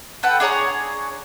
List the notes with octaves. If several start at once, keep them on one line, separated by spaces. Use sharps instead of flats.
A4 B4 F#5 G5
D4 G#4 C#5 A#5